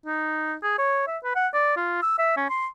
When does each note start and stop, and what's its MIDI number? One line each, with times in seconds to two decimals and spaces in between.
0.06 0.55 63
0.63 0.76 68
0.78 1.04 73
1.07 1.18 76
1.24 1.34 71
1.36 1.48 78
1.54 1.76 74
1.77 2.00 65
2.02 2.16 88
2.19 2.33 76
2.37 2.47 61
2.50 2.67 84